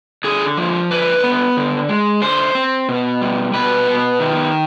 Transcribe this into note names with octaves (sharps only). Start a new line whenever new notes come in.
D3 G#4
F3
D3 B4
B3
D3
G#3
D3 C5
C4
B2
G3
B2 B4
B3
D#3